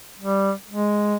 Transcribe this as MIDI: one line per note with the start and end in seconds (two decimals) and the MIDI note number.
0.19 0.52 55
0.70 1.16 56